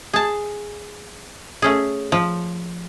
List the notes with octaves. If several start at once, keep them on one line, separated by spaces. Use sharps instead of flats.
G#4 A5
A3 C#4 G#4
F3